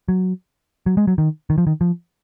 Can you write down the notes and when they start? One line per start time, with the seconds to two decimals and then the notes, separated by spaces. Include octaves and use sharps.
0.08 F#3
0.86 F#3
0.97 G#3
1.07 F#3
1.18 D#3
1.50 D#3
1.58 F3
1.67 D#3
1.81 F3